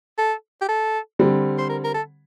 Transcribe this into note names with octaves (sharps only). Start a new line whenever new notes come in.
A4
G4
A4
D3 G3 C4
C5
A#4
A#4
A4